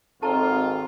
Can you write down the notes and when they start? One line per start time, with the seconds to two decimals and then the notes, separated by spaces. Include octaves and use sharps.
0.23 G#1 C4 F4 A4 A5 A#5 C#6